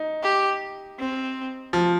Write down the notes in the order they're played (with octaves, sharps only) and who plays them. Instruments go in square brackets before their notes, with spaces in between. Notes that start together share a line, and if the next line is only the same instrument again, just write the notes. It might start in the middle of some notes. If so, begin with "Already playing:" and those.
Already playing: [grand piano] D#4
[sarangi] G4
C4
[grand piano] F3